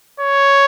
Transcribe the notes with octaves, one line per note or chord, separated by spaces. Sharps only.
C#5